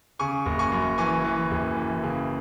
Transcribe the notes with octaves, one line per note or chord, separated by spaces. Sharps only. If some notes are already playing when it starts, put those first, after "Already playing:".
C#3 G#5 C#6
F#1
G#5 C#6
F#2
E3 G#5 C#6
E3
F#1
E3
C#3